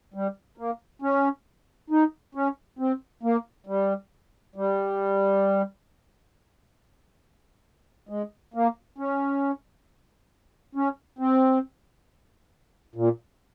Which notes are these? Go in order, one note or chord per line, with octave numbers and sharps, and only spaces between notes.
G3
A#3
C#4
D#4
C#4
C4
A#3
G3
G3
G#3
A#3
C#4
C#4
C4
A#2